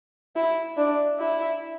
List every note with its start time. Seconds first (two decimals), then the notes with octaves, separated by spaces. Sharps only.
0.36 E4
0.77 D4
1.19 E4